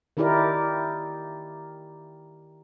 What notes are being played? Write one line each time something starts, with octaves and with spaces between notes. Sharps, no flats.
D#3 D#4 E4 G4 A#4 D5